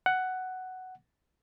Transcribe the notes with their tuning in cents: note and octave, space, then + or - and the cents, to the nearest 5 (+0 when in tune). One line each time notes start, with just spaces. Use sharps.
F#5 +5